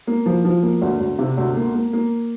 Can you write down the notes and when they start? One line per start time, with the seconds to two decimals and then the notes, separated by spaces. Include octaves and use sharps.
0.07 A#3
0.26 F3
0.45 F3
0.63 A#3
0.82 D2
1.00 D2
1.19 C3
1.37 D2
1.56 A#3
1.75 A#3
1.93 A#3